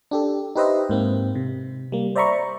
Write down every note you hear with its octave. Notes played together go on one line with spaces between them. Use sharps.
D4 G4 A4
D#4 G4 B4 C5 D#5 E5
G#2 A#3 C4
C3
G3 A#3
C5 D5 E5 A#5 B5 C#6